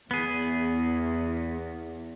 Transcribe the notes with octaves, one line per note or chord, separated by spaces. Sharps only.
E2 B3 G#4